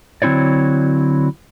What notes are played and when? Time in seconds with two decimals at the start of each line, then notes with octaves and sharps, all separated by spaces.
0.22 D3 F#3 C4 E4 C#5 D5